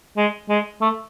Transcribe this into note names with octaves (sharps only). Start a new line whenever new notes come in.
G#3
G#3
A3